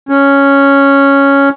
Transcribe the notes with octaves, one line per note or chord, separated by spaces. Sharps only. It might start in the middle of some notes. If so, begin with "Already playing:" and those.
C#4